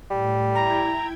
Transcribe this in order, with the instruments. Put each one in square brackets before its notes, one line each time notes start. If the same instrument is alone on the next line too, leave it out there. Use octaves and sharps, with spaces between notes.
[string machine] A2 [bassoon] G3
[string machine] E4 G5 G#6 [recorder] A#5